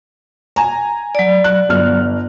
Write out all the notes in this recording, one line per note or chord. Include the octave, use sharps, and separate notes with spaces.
G#5 A#5
F#3 D5
F#6
G1 F6